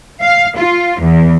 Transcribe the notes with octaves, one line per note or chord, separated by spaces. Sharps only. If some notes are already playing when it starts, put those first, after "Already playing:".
F5
F4
E2